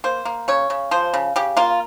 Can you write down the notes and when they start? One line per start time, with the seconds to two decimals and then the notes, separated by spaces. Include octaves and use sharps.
0.04 A#3 C5
0.25 A#3
0.48 C#3 C#5
0.70 C#3
0.91 F3 C5
1.14 C#3
1.36 C#3 G4
1.57 A#3 F4